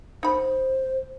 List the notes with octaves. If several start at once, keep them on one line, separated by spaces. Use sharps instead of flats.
D#4 C5 B5